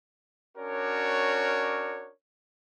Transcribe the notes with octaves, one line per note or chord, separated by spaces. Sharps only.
C#4 D4 F#4 A#4 C#5 D5